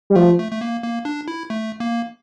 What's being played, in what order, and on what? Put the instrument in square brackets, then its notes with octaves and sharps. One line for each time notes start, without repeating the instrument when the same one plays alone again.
[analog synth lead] G3
[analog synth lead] F3 [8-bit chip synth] A3
[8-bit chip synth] A3
A3
A#3
A#3
D4
E4
A3
A#3